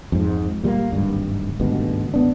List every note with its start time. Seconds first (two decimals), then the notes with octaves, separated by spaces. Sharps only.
0.12 F2 G#2
0.64 A#2 G3 A3 A#3
0.92 D1 G#1 G2
1.60 G#1 D2 G2 B2
2.14 G#1 B3 D4